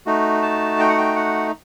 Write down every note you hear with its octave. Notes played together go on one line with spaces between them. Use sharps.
A3 D#4 F#4
A5
G5
F#5
G5
F#5